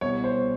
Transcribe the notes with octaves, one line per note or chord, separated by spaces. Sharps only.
C2 B2 G3 C#5
C5